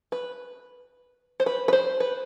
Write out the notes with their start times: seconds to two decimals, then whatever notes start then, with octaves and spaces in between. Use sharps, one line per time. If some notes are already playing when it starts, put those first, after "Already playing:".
0.12 B4
1.40 C5
1.46 B4
1.68 B4
1.73 C5
2.00 B4